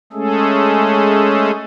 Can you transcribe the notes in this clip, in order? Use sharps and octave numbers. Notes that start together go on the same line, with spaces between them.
G#3 A3 C#4 G#4 A4